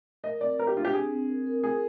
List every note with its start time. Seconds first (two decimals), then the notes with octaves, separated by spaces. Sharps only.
0.24 A#4 D#5
0.41 C4 D5
0.59 A#4 D#5
0.67 G4
0.77 D4 F4
0.85 G4
0.94 C4 G#4
1.12 C4
1.29 A#4
1.46 A#4
1.64 F4 G#4